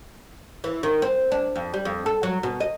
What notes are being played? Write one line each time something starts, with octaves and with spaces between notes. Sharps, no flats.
E3
D#3
C4
D4
F2
G3
F2
A4
F#3
B2
D#5